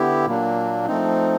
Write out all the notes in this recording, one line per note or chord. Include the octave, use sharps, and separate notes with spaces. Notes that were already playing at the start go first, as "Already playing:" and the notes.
Already playing: D3 B3 E4 G4
A#2 F#3 A#3 D4
F3 A3 C4 D#4